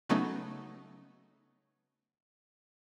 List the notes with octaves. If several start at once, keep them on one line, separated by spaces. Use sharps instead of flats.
C#3 F#3 A3 B3 C#4 D#4